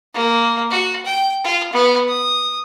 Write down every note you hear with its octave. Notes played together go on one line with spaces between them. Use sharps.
A#3
F#4
G5
F4
B3
D#6